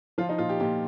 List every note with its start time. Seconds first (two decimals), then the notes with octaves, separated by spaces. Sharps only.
0.18 F3 F4
0.29 D#4
0.38 A#2 F4
0.49 G4
0.60 A#2 G4